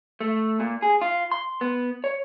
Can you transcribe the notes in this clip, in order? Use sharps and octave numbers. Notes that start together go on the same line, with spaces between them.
A3
A#2
G#4
F4
C6
B3
C#5